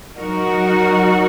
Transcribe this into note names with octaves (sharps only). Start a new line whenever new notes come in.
F#3 D#4 F#4 A#4